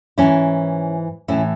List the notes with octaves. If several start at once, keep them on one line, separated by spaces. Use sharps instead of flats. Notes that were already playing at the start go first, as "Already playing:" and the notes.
G#2 E3 C#4 E4
A2 E3 C#4 E4